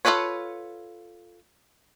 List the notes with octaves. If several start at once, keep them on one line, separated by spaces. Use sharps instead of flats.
F4 F#4 A4 B4 C#5